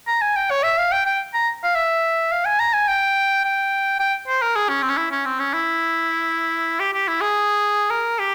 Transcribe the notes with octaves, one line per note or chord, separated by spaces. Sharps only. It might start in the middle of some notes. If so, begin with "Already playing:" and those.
A#5
G#5
G5
C#5
E5
F5
G5
G5
A#5
F5
E5
F5
G#5
A#5
G#5
G5
G5
G5
C5
A#4
G#4
C#4
C4
C#4
E4
C#4
C4
C#4
E4
G4
G4
E4
G#4
A#4
G4